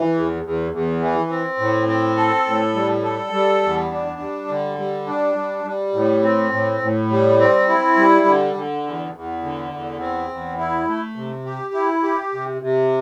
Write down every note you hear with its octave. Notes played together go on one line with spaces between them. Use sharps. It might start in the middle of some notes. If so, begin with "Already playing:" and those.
Already playing: E3
E2
E2
E2
E3
C4
A2
C4
A4
A2
G3
A4
G3
E2
D4
G3
D3
G3
D4
G3
G3
A2
C4
A2
A2
G3
C4
E4
G3
D3
D3
E2
E2
D3
E2
C4
E2
E4
A3
C3
G4
E4
G4
C3
C3